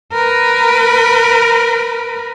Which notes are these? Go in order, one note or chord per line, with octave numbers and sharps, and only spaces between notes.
A#4 B4